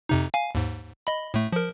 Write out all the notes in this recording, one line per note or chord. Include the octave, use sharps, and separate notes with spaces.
F2 C3 D#4
F5 G#5
D#2 G#2
D#5 B5
A2 A3
F3 A#4